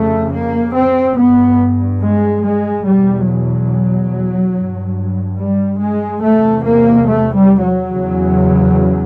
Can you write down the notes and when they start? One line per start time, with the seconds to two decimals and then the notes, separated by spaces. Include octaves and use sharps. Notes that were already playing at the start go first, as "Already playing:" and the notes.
Already playing: F2 C#3 A3
0.33 A#3
0.74 C4
1.17 G2 B3
2.01 G#3
2.43 G#3
2.85 E2 B2 G3
3.27 F#3
4.54 G2
5.38 G3
5.79 G#3
6.22 E2 C3 A3
6.64 A#3
7.06 A3
7.34 G3
7.63 F#3
7.90 E2 C#3